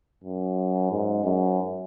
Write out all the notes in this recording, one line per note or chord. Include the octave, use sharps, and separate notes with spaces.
F#2
G#2
F#2